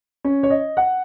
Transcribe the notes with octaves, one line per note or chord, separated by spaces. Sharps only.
C#4
C#5
D#5
F#5